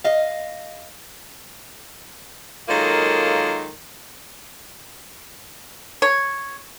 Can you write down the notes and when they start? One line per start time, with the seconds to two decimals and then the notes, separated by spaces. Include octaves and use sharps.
0.04 D#5 F5
2.68 D#3 F#3 G#3 A#3 F4 A4
6.02 C#5